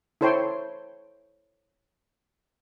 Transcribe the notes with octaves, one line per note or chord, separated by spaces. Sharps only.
E4 A4 C5 C#5 G5 C6